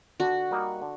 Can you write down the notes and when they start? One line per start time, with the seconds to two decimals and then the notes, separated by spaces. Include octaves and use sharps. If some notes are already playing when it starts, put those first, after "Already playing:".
0.20 D3 F#4
0.51 G3 A#3 D#4
0.82 D3